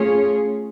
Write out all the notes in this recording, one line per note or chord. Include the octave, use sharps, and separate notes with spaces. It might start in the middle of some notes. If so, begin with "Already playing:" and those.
Already playing: A3 C#4 F4 G#4 C#5